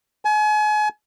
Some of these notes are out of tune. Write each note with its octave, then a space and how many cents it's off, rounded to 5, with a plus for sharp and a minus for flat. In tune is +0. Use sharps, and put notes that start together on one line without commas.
G#5 +35